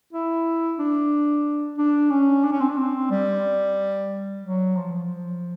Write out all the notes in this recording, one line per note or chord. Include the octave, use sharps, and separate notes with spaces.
E4
D4
D4
C#4
D4
C#4
C4
D4
C4
G3
F#3
F3
F3